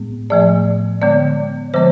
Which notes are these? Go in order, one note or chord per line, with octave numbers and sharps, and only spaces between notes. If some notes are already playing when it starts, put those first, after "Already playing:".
Already playing: A2 G#3 B3
A2 F3 A3 D5
D3 G#3 B3 D5
D3 F3 G#3 B3 C5